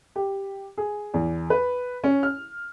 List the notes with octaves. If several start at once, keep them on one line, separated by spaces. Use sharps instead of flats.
G4
G#4
E2
B4
C#4
F6